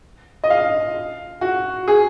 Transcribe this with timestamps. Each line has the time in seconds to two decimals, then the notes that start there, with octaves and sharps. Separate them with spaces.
0.44 D#5
0.50 F5
1.41 F#4
1.88 G#4